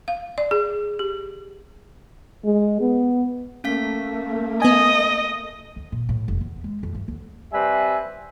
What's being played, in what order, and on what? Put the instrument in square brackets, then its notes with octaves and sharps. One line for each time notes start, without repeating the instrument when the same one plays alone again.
[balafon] F5
D5
G#4
G4
[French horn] G#3
B3
[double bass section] A3 A#3 [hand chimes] C#4 F5 B6
[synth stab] B3 G#5 [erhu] D#5
[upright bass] D2
A#2
A2
F1
E2
G#3
F2
G2
D2
[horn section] C3 G3 C4 B4 E5 G#5